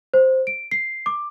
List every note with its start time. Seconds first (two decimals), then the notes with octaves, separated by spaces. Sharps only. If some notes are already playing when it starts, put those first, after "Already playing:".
0.14 C5
0.47 D7
0.71 C7
1.06 D6